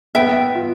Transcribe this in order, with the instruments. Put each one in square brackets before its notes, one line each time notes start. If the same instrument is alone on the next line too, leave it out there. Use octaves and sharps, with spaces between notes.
[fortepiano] B3 [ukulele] E5 G5
[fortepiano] F4